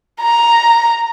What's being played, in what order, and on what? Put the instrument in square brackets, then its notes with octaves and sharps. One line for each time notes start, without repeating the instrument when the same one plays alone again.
[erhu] A#5